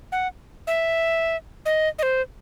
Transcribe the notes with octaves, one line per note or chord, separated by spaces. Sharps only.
F#5
E5
D#5
D#5
C5